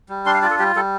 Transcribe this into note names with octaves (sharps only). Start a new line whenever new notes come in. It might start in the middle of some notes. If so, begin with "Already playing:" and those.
G3
D4 C6
F5
F4 D5
A4
G3 G4
G3 A4